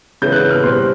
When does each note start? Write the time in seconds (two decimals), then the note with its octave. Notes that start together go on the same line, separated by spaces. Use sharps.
0.22 C#3 E3 G#3 B3 G6
0.32 F#6
0.36 G6
0.51 F6
0.64 B2 G3 C4 C6